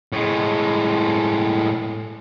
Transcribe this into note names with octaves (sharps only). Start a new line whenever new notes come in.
A2 G#3